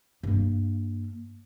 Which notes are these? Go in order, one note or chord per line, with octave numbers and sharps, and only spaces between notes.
G2 A#3